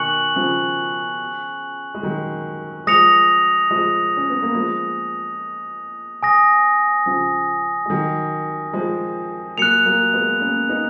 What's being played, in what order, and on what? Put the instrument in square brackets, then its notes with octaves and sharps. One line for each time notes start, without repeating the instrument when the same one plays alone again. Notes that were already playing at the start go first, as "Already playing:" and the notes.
Already playing: [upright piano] B2 D#3 [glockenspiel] G#5 C#6 F#6 C#7 F#7
[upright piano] C#3 F3
G#3
D#3 F#3
[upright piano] F3 G#3 [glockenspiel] D#6 A#6 C#7 F7
[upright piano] F3 G#3
C#4
B3
A#3
F3 G#3
[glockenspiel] G#5 D#6 A#6
[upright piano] C#3 F3
G#3
D#3 F#3
F3 G#3
[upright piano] F#3 A#3 [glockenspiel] F#6 C#7 F7
[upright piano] F#3 A#3
G#3 B3
A#3 C#4
B3 D#4